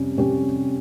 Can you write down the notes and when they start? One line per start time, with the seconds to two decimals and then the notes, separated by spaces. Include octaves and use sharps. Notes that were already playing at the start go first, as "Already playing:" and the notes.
Already playing: F2 C3 G3 C#4
0.17 F2 C3 G3 C#4 G4